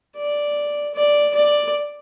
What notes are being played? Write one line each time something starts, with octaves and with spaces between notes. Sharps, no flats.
D5
D5
D5